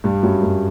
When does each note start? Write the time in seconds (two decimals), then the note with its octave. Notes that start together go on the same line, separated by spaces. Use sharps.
0.04 G2 G3
0.23 F#2 F#3
0.42 F#2 F#3